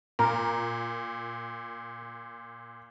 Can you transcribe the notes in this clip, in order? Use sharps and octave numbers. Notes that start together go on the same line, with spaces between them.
A#2 A#4